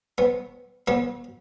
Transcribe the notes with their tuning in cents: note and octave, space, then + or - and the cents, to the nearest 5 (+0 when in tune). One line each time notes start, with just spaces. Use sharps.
B3 -5
B3 -35